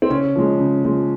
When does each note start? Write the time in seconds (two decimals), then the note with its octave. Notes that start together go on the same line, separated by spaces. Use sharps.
0.02 C4
0.10 C#3 C#4
0.35 F3 G#3
0.60 C#3
0.84 F3 G#3